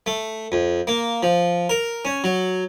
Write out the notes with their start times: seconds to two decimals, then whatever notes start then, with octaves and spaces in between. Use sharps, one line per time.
0.06 A3
0.52 F2
0.87 A#3
1.23 F3
1.69 A#4
2.05 C#4
2.24 F#3